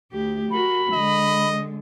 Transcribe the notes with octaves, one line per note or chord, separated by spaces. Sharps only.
D2 G4
F#4 A#4 B5
D3 G#3 D#5